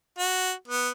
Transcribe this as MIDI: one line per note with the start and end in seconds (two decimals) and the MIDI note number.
0.19 0.52 66
0.68 0.89 59